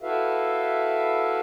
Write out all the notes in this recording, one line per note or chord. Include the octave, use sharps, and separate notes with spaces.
E4 F#4 A4 B4 E5 F5